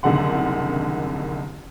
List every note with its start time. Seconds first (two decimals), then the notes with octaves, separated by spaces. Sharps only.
0.03 F#1 C2 D3 D#3 F#5 C6